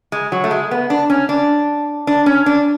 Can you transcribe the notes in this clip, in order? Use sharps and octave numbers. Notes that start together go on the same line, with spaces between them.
G#3
F#3
A3
G#3
B3
D4
C#4
D4
D4
C#4
D4